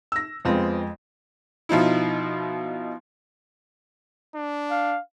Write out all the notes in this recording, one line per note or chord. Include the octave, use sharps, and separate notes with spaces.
E6 A#6
F2 G#3 B3 C4 F4
B2 F3 D#4 E4
D4
F5